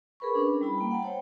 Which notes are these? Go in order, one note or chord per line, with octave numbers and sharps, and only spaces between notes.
G#4 A#4 B4 B5 C#6
C#4 D4 G#4
G3 E4 B5
A#3 G5
F#5 A5
C5 C#5 G5